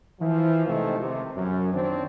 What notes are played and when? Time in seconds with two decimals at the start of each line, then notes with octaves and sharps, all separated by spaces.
0.20 E3 F3
0.66 C3 D#3 F3 G#3 A3 C4
0.99 C3
1.36 F#2
1.74 D#3 F3 C4 D4 C#5